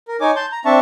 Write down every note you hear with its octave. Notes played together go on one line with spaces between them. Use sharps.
A#4
D#4 C#5 G#5 D6
A5 C6 G6
A#5
C4 D4 E5 A5 C#6